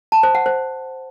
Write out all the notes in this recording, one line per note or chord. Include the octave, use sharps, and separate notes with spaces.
A5
C5
F#5
C5